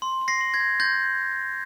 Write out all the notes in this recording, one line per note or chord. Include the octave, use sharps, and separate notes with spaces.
C6
C6
A#6 C7
C6
G#6 A#6
G6
C6 G6 A6